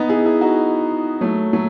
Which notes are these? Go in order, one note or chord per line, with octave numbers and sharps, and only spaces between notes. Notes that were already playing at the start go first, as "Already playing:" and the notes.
Already playing: B3 D#4
E4 G#4
E4 G#4
D#4 F#4
F#3 A3
F#3 A3